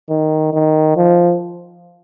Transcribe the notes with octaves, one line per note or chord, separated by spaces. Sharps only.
D#3
D#3
F3